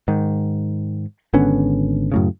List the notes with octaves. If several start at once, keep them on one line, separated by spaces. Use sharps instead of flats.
G#2 D#3
G#1 D3 B3 C#4
F#2 A2 C#3